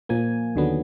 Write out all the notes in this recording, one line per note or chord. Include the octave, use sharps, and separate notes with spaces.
A#2 F3 A#3 G#5
D#2 D3 F#3 B3